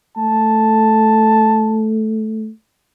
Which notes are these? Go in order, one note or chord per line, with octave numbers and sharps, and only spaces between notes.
A3 A5